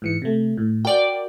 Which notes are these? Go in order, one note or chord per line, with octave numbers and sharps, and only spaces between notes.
G#2 E3 C#7
C3 A3
A2
F#4 A#4 D5 G5